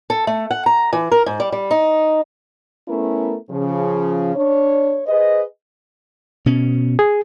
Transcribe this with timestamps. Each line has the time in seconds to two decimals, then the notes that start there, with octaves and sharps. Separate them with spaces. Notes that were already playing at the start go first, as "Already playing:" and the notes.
0.10 A4
0.27 A3
0.51 F#5
0.66 A#5
0.93 E3
1.11 A#4
1.26 G#2
1.40 G3
1.52 G3
1.71 D#4
2.88 A3 B3 C#4 E4 A4 A#4
3.51 C#3 F3
4.36 D4 C#5
5.07 G#4 B4 C5 D#5
6.46 B2 C#4
6.99 G#4